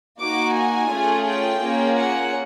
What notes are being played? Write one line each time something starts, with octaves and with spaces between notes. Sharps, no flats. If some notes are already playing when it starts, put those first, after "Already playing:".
A#3 D#4 F#4 D6
G#5
A3 C#4 F4 G#4
G5
A#3 C#4 F4 G#4
F#5